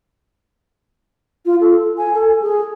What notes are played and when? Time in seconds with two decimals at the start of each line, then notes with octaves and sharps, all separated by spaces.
1.46 F4
1.61 A4
1.98 G#5
2.14 A4
2.42 G#4